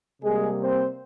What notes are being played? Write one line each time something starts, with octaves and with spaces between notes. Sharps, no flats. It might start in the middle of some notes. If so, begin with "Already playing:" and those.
C3 G3 G#3 A#3 G#4
C4 C5